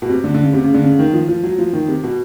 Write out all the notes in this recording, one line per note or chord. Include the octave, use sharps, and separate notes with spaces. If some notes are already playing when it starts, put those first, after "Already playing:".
B2
C3
D3
D3
C#3
C3
C#3
D3
C#3
D#3
F3
F3
F#3
F3
D#3
C3
B2